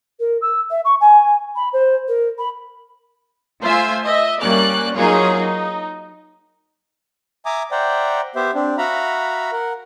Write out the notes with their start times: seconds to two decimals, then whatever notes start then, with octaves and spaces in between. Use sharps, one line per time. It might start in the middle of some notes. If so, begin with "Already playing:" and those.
0.19 A#4
0.41 E6
0.70 E5
0.84 C#6
1.00 G#5
1.55 B5
1.73 C5
2.08 A#4
2.38 B5
3.63 A3 F4 C5 E5 G#5
4.04 D#5 E5
4.41 G3 A#3 C#4 D5 F#6
4.96 F#3 A#3 D#4 F4 G#4
5.39 D#4
7.46 E5 G#5 A#5 D6 D#6
7.71 C5 D5 E5 F#5 G5 A#5
8.36 B3 G4 C5 E5
8.55 C4 D4
8.78 F#4 E5 F5 A#5 B5
9.52 A#4 F#5